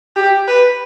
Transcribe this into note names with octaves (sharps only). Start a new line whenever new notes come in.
G4
B4